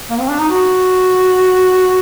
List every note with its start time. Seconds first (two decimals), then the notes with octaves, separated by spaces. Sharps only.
0.10 A#3
0.20 C4
0.30 D4
0.40 D#4
0.50 F#4